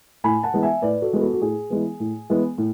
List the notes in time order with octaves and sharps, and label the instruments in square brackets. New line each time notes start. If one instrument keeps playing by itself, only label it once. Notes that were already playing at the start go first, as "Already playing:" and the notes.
[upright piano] A2 G#5 B5
F#5 A5
E3 G#3 B3
E5 G#5
A2 B4 D5
F#4 A4
E3 G#3 B3
F#4 A4
F#4
A2 G#4
E3 G#3 B3
A2
E3 G#3 B3
A2